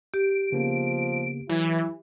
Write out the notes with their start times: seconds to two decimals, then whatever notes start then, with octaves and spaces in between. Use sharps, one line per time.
0.14 G4 D7
0.52 C#3 F3 A#3 B3
1.49 E3 F#3 E4 G#6